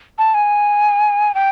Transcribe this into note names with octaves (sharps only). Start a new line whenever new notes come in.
A5
G#5
G5